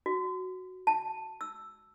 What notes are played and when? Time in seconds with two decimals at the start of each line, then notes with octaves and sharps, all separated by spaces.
0.06 F#4
0.87 A5
1.41 E6